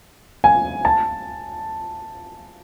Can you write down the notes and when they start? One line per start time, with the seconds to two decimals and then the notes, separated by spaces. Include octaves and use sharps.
0.44 G#5
0.85 A5